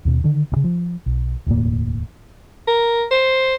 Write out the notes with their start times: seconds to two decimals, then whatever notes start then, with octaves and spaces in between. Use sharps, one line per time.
0.05 D#2 B2
0.24 D3 D#3
0.52 D2 C#3
0.64 F3
1.06 B1
1.47 E1 D2 A2 A#3
2.67 A#4
3.11 C5